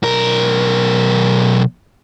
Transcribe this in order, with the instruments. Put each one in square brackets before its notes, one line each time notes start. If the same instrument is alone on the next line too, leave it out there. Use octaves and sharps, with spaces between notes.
[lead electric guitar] B1 A#4